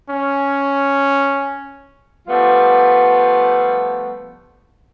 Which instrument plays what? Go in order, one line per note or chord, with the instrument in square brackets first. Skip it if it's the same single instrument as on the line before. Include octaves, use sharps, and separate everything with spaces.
[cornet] C#4
[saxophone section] F3 G3 A3 B3 F4